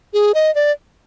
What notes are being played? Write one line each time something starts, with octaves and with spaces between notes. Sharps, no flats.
G#4
D#5
D5